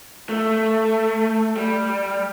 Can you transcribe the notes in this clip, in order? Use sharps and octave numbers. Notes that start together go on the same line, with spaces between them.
A3
G3